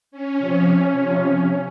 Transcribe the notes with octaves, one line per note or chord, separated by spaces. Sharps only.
C#4
C3 F3
C3 F3